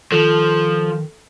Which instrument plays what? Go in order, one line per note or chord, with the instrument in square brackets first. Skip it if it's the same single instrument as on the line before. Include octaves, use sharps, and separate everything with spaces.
[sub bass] D#3 [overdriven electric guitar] F3 [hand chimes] A4